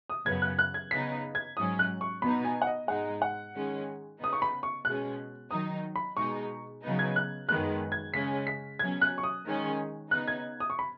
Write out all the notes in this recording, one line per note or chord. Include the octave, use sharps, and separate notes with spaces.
D#6
F#2 C#3 F#3 B3 G#6
F#6
F#6
G#6
C#3 B3 D#4 B6
G#6
G#2 F#3 C#4 D#6
F#6
C#6
B2 B3 D#4 B5
G#5
F#5
D#5
G#2 G#3 D#4 F#5
F#5
D#3 G#3 C#4
C#3 B3 D#4 D#6
C#6
B5
C#6
B2 G#3 C#4 F#6
D#3 F#3 D#4 D#6
B5
B2 G#3 D#4 C#6
C#3 F#3 B3 D#4
G#6
F#6
F#2 D#3 G#3 B3 F#6
G#6
C#3 G#3 C#4 B6
B6
B2 F#3 C#4 G#6
F#6
C#6
D#6
D#3 G#3 C#4
C#3 B3 D#4 F#6
G#6
D#6
C#6
B5